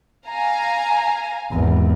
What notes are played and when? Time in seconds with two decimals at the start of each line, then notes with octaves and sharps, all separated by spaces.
0.28 F5 G#5 A#5
1.51 G#1 E2